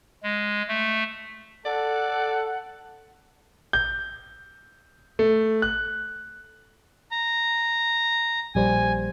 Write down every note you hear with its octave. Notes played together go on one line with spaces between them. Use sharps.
G#3
A3
A4 D5 F#5
G6
A3
F#6
A#5
A#1 G3 C5 G#5